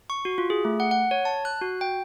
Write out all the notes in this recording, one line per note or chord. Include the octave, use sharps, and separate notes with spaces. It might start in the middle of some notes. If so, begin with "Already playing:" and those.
C#6
F#4
F4
G#4
A3
F#5
F#5
C#5
A5
F#6
F#4
G5